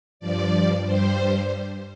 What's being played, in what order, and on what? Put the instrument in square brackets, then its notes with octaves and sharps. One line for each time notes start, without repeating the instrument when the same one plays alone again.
[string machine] G2 F3 D5
G2 G3 C5